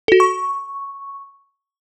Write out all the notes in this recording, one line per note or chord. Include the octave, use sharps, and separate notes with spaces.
F#4 A4
C#6